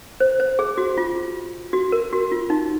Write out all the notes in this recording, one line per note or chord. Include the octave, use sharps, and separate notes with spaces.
C5
C5
G#4
F#4
F4
F#4
A#4
F#4
F4
D#4